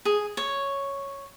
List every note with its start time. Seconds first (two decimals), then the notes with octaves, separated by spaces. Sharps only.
0.05 G#4
0.37 C#5